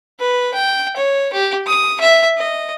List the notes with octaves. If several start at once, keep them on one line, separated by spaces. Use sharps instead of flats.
B4
G5
C#5
G4
D#6
E5
D#5